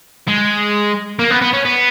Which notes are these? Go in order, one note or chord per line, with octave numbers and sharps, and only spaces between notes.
G#3
A#3
B3
B3
C#4
B3